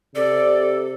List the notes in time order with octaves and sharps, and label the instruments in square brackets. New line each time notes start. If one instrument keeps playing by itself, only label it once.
[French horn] C3 [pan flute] A4 [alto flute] D5